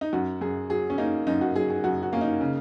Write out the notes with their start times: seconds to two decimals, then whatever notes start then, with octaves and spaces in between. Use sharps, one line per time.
0.01 D#4
0.13 F#2 F#4
0.41 F#2 G#4
0.70 F#3 G#4
0.90 C#4
0.98 A#3 D#4
1.27 F#2 D#4
1.41 F#4
1.55 F#3 G#4
1.70 G#4
1.84 F#2 F#4
2.03 F#4
2.13 A#3 C#4
2.21 D#4
2.41 C#3